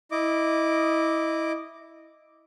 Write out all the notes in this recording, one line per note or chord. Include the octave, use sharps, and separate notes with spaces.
E4 D#5 D6